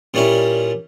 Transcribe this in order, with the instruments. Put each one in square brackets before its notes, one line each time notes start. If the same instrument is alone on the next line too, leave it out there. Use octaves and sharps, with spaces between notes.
[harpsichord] A#2 G3 C#4 E4